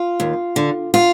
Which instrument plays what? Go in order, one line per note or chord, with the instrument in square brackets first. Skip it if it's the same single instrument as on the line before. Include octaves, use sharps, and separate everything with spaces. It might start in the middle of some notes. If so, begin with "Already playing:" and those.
Already playing: [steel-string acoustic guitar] F4
D#2
D3
F4